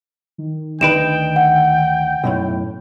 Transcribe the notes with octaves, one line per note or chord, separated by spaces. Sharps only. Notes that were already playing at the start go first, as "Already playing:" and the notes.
D#3
D2 D#4 B4 G5 D7 E7
F#5
B1 F#2 A2